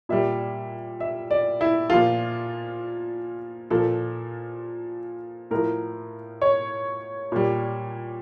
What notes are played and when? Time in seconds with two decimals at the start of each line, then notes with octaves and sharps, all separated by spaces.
0.09 A#2 G3 E5
1.00 E5
1.31 D5
1.61 E4
1.90 A#2 F3 F4
3.70 A#2 F3 A4
5.51 A2 F3 A#4
6.42 C#5
7.32 A#2 G3